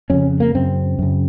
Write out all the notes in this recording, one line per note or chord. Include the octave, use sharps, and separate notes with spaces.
F2 C#3 C#4
A#3
F#2 C#3 C4
F#2 C#3